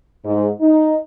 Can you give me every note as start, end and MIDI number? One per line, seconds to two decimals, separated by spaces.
0.25 0.48 44
0.61 0.96 63